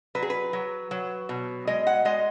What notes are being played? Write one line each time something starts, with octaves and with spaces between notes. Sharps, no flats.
F#3 B4
G#4
B4
F#3
F#3
B2
G#3 D#5
F#5
G#3 D#5